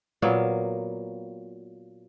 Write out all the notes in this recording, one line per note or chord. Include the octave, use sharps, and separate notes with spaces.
A#2 F#3 A#3 B3